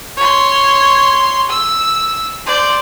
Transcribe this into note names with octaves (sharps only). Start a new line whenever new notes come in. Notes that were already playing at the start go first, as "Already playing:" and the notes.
C#5 C6
E6
C5 D5